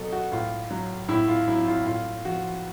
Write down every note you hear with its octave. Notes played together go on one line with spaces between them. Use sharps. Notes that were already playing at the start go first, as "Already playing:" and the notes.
Already playing: B2 F#3 A4
F#4
A2 F4
F#3
A2 E4
F4
F#3 E4
F4
A2 F4
F3 F#4